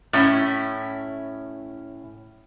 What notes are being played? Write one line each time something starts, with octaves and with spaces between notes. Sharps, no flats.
A2 C#4 E4